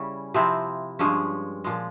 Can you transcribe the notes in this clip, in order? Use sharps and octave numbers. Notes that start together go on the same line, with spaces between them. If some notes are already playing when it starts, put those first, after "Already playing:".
Already playing: C#3 G3 C#4 E4
C3 F3 C4 E4
G2 F3 G#3 C#4
A#2 F3 G#3